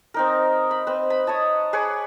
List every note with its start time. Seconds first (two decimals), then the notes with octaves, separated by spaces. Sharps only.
0.14 C4 D#4 A#4
0.71 B5
0.87 C4 B4
1.10 B5
1.27 C#5 D#5 A5
1.73 G#4 B4 C#5 D6